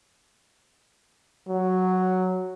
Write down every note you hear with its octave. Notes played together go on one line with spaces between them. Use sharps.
F#3